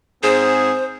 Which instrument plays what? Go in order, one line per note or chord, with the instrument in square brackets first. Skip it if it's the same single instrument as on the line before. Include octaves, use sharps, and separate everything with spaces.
[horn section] G#2 C4 G#4 [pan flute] C5